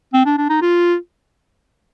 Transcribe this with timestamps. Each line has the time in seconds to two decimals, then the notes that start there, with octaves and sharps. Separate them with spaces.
0.13 C4
0.26 D4
0.38 D4
0.49 D#4
0.61 F4